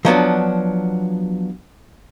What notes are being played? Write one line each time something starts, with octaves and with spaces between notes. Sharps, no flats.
F3 F#3 B3 D4